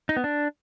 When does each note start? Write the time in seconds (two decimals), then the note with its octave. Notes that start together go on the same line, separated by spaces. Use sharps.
0.09 D#4
0.16 B3
0.24 D4